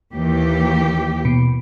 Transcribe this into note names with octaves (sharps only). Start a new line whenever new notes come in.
D#2 E3 G4
B2